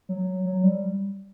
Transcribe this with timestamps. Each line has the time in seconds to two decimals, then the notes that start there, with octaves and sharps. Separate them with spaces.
0.09 F#3
0.45 F#3
0.63 G3